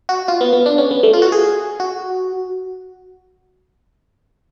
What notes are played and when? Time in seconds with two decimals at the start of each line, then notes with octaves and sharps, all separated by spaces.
0.09 F#4
0.28 F4
0.41 B3
0.53 B3
0.66 D4
0.78 C#4
0.91 B3
1.03 A3
1.13 F4
1.22 F#4
1.32 G#4
1.80 F#4